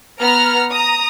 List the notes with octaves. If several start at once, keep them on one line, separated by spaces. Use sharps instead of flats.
B3 A#5 F6
A#5 D#6